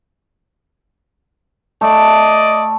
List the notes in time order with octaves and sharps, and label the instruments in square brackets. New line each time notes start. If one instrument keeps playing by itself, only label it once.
[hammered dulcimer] A3 [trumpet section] D5 D#5